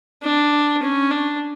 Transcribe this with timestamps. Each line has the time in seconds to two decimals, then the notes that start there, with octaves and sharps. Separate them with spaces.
0.23 D4
0.82 C#4
1.10 D4